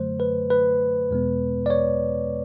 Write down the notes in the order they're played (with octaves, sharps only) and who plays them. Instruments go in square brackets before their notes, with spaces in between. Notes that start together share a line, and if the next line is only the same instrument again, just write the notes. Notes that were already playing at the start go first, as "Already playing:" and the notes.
Already playing: [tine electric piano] F#2 D3 F#3 A3 C5
B4
B4
E2 B2 G#3 B3
D5
C#5